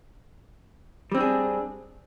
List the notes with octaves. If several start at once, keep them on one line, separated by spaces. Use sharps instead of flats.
G3 C4 D4 G#4